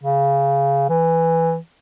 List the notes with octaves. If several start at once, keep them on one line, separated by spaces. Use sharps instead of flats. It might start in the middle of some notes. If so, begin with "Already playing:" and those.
C#3
E3